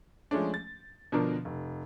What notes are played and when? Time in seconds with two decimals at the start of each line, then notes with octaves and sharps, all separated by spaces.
0.31 F3 G#3 A3 C#4 D4
0.54 A6
1.12 B2 D3 F3 D4 A#4
1.45 F1